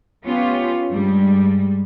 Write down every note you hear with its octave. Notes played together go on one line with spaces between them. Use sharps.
B3 C#4 F4 G4
G2 G3 G#3